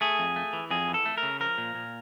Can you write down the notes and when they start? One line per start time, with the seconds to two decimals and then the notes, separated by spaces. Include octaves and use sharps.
0.01 A3 G#4
0.19 F2
0.36 A3
0.53 E3
0.70 F2 G#4
0.88 E3
0.94 A4
1.05 A3
1.18 A#4
1.23 C#3
1.40 F3 A#4
1.58 A#2
1.75 A#2